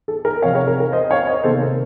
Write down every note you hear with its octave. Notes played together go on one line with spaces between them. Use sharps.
A4
A#4
C3 F3 C4 C#5 F5
A#4 C#5
A#4
A#4
C5 D#5
C#5 F5
C5 D#5
C3 D#3 A#3 A4 C5
A#4